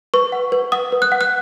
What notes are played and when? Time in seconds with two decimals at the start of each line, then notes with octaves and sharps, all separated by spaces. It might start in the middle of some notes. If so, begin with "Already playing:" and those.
0.14 B4 C#6
0.32 F#5
0.52 B4
0.72 F#5 D#6
0.92 B4
1.02 F#6
1.12 F#5
1.21 F#6